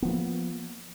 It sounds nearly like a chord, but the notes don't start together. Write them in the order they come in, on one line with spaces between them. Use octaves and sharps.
B3 F3 A#3